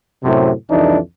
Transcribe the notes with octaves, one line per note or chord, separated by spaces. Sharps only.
F#2 A2 C3
C2 F2 E3 D4 D#4